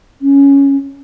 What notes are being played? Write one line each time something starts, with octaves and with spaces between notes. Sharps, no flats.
C#4